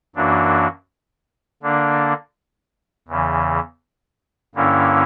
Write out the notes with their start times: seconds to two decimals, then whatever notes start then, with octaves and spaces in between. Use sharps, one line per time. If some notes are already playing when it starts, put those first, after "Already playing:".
0.16 F#2 E3 A#3 D4 F#4
1.63 D3 A#3 D4
3.08 E2 C#3 E3
4.55 G2 D3 A#3 C#4 E4